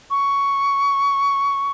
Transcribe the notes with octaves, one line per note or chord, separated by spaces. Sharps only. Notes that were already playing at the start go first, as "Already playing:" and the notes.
C#6